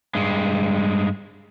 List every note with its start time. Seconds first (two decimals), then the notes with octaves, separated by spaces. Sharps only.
0.15 G2 G#3